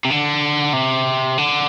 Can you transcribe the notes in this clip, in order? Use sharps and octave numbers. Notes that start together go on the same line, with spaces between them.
C3
D3
C3
D3